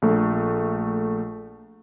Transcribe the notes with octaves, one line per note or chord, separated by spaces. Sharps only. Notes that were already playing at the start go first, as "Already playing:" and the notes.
A#1 A3